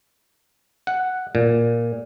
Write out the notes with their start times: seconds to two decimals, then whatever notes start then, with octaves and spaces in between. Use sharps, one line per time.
0.87 F#5
1.35 A#2